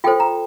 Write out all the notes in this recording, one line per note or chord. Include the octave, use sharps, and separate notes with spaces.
F4 A4 C5 G5
A#5